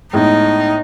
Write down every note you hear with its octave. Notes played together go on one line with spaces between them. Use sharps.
A2 G#3 B3 D#4